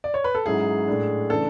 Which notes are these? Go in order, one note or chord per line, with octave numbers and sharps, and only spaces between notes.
D5
C#5
B4
A4
G#2 F#3 C#4 E4 G#4
A2 G#3 D4
C#3 E3 A3 D4 A4